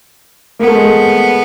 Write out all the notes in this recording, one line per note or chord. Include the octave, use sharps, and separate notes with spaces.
A#3 B3
A3
G#3
A3